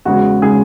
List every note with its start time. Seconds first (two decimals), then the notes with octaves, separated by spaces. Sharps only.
0.05 E2 C#3 G#3 F#4
0.42 C#3 G#3 G#4